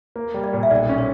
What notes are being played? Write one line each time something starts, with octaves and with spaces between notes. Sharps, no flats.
A#3
G3
D5
A#2
E5
B1 D5
C#4
C#5